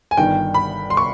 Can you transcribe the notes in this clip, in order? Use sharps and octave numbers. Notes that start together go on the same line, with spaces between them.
G#5
G1 G2 D#3 G5
B5
C6
C#6